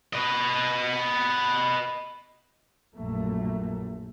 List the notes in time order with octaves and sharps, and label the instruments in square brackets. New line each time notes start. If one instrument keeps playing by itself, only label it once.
[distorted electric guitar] B4 D#5
[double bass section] A#1 F#2 A3 A#3